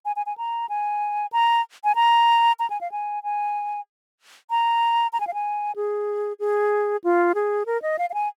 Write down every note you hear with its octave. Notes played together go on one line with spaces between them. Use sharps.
G#5
G#5
G#5
A#5
G#5
A#5
G#5
A#5
A#5
G#5
F5
G#5
G#5
A#5
A#5
G#5
F5
G#5
G#4
G#4
F4
G#4
A#4
D#5
F5
F5
G#5